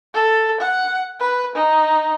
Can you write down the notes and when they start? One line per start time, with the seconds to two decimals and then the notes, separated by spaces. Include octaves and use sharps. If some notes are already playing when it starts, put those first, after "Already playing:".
0.14 A4
0.61 F#5
1.20 B4
1.55 D#4